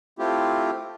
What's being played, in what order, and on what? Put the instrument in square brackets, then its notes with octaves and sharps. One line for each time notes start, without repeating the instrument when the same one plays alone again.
[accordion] A3 C4 E4 F4 G4